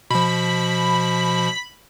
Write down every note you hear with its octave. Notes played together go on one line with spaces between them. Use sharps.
B2 F3 B5